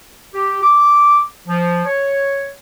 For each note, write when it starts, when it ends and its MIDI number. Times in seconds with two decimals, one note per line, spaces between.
0.33 0.61 67
0.62 1.20 86
1.47 1.85 53
1.86 2.51 73